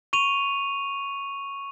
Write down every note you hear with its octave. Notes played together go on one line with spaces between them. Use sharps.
C#6 D#7 F7